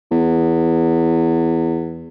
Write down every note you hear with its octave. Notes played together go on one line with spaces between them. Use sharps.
E2